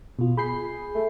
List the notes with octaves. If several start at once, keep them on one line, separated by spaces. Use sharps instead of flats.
B2 F4
G#4 B5 G6 C7
A3